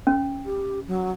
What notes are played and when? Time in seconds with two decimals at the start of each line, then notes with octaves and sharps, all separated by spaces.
0.07 C#4
0.45 G4
0.88 F#3